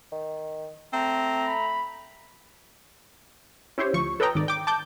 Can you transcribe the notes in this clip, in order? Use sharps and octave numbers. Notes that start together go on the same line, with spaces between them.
D#3
A3 C4 A#5
B5
C#4 E4 G4 C5 C#5
D2 F3 C#6
A4 B4 C#5 D#5 G5 A#5
G#1 D#3 D5
G5 D6
A5 D6 G6